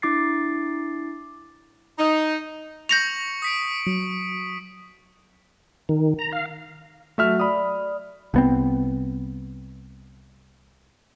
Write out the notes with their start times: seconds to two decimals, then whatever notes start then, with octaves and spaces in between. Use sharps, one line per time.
0.02 D4 E4 D6 A6 C7
1.98 D#4
2.89 C#6 G6 A#6 C#7 F7 F#7
3.42 D#6 B6 D7
3.87 F#3
5.89 D#3
6.19 A#5
6.32 F5
7.18 F#3 A3 F#4 E5 F6
7.40 D5 B5 D#6
8.34 C2 B3 C4